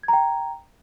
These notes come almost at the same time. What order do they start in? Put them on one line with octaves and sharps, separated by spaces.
G#6 A#5 G5